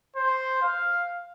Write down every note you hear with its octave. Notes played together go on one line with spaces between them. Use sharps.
C5
F5